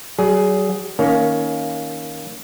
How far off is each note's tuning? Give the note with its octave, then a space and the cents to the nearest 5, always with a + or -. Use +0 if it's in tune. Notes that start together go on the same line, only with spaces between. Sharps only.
F#3 +40 G#4 +5
D#3 +25 A#3 +0 C#4 +15